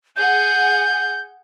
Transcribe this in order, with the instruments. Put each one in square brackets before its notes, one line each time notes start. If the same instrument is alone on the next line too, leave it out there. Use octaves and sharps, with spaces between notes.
[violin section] G#4 F#5 G#5 [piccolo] G6